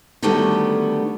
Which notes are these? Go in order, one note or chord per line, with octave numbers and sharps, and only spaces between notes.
D3 D#3 F#3 G3 A3 B3